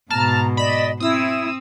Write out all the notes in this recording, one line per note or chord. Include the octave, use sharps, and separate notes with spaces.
G#2 B2 A5 A#5 F6
D5 D#5 B5 E7
C4 E4 D#6 E6